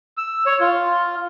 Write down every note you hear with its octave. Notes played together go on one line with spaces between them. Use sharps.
E6
C#5
F4